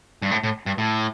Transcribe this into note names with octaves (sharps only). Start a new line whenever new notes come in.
G2
A2
A2
G2
A2